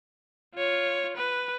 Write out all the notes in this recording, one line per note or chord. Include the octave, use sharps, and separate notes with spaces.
F4 C#5
B4